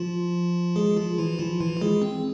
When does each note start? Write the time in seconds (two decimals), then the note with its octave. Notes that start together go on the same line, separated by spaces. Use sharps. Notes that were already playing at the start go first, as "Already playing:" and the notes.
Already playing: F3 F4
0.76 G#3 G#4
0.97 F3 F4
1.18 E3 E4
1.39 F3 F4
1.60 E3 E4
1.77 F4
1.82 G#3 G#4
2.02 C4